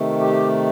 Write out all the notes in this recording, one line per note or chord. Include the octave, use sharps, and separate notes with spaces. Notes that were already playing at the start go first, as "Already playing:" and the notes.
Already playing: C3 D#3 A3
G4